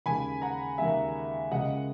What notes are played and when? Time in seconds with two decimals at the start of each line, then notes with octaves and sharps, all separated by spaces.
0.06 D#2 C#3 G#3 G#5 B5
0.42 F#5 A#5
0.78 D#2 C#3 G#3 E5 G#5
1.51 C#2 C#3 G#3 D#5 F#5